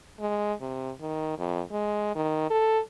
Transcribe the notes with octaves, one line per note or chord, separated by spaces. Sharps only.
G#3
C3
D#3
F2
G#3
D#3
A4